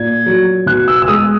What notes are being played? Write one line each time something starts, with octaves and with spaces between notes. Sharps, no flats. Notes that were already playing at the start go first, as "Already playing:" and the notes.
Already playing: A#2 G#6
F#3
B2 F#6
E6
E6
G#3 D#6